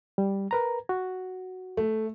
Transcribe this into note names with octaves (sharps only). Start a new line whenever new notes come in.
G3
A#4 B4 A#5
F#4
A3